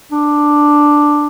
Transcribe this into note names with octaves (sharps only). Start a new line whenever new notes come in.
D4